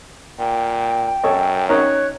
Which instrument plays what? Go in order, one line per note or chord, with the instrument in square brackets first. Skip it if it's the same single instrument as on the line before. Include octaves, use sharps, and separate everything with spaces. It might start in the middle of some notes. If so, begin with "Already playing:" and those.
[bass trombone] A#2 [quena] G5
[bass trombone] F#2 [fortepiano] A4 C#5 D#5
[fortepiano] C#4 D#4 A#4 [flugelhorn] C#5 [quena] F#6